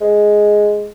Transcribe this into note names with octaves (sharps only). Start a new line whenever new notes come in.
G#3